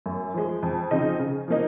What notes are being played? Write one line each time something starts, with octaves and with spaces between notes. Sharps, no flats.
F#2
F3 G#3
F2
C#3 F3 C4 D#4
C#3
F3 A#3 D#4